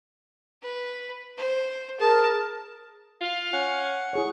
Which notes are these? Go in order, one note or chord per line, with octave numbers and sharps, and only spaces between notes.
B4
C5
G#4 A#4 A5
F4 F5
C#4 F#5
E4 G#4 C#5 C#6